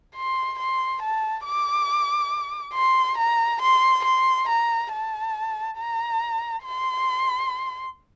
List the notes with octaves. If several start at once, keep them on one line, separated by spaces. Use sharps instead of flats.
C6
C6
A5
D6
C6
A#5
C6
C6
A#5
A5
A#5
C6